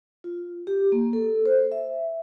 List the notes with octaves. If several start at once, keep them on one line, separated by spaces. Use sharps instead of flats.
F4
G4
A#3
A4
C5
E5